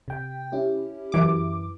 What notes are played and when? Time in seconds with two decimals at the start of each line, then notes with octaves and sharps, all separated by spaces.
0.08 C3 G5
0.52 C#4 E4 G4
1.12 F#2 E3 D6